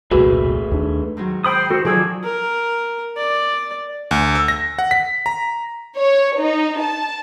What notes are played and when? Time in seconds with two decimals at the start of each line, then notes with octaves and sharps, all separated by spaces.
0.11 E1 C2 A#2 A3 F#4 G#4 B4
0.71 D#2 D4
1.17 G#2 D#3 F#3
1.44 C5 G5 B5 D#6
1.70 F#4 A4
1.85 D#3 F3 F#3 G#4 D5 E6
2.24 A#4
3.17 D5
4.11 D2
4.35 E6
4.48 A#6
4.79 F#5
4.91 B6
5.26 A#5
5.96 C#5
6.39 D#4
6.79 A5